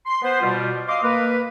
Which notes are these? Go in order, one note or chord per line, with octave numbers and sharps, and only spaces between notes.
C6
B3 B4 C5
B2 G3 F4
D#5 F5 C6 D6 D#6
A#3 A#4 B4